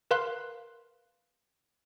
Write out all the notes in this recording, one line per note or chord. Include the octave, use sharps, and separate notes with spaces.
A#4 B4 F5 C6 F#6